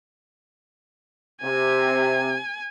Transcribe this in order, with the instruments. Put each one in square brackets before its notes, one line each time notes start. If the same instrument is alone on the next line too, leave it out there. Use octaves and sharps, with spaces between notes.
[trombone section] C3 [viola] G#5